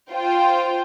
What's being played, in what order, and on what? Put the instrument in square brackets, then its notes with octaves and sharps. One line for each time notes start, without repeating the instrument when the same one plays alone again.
[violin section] F4 C5 G5